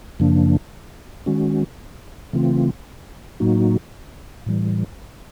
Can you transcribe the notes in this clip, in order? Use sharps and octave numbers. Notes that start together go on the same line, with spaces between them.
F#2 C#3 F3 A#3 D4
D#3 G#3 C#4 F#4
C#3 E3 A3 C4 F4
A2 F#3 A#3 D#4 F#4
A2 E3 G3